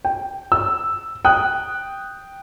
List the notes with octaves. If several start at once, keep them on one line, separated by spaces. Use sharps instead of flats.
G5
E6
G5 D#6 F#6